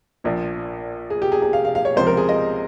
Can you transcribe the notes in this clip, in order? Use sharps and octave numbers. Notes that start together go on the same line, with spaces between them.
A#1 A#2 F3
G#4
G4
G#4
G#4
F5
F5
F5
C#5
C#2 C3 F3 C5
A#4
G#4
D#5